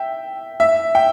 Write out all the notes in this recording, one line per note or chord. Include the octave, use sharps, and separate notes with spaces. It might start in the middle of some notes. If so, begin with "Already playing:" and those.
Already playing: E5 G5
E5
G5